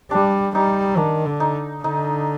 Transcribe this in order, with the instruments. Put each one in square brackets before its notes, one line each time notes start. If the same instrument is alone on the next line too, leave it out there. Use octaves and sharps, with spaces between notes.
[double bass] G3 [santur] D4
[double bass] G3 [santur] D#4
[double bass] D#3 [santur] D4
[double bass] D3
[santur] D#4
[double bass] D3 [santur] D#4